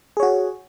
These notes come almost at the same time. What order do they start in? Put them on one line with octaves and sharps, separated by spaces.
G#4 C#5 F#4